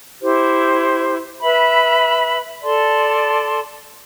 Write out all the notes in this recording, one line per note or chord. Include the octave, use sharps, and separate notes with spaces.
E4 G4 C5
B4 E5 B5
A4 D5 A5 C6